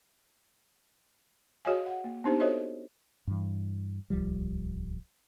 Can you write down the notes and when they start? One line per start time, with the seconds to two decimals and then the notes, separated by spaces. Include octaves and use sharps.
1.65 F#4 G#4 C#5 D#5 F5 G#5
1.86 F#5
2.04 A#3
2.24 B3 C4 D4 D#4 G4 C5
2.40 F#4 A4 C5 C#5 D#5 E5
3.27 G2 E3
4.10 D1 C2 F3 G3